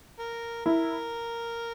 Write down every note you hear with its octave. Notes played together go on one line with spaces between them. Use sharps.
A#4
E4 A#4